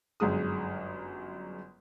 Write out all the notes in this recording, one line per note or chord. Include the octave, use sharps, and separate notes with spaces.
G1 F#2 G#3 D#6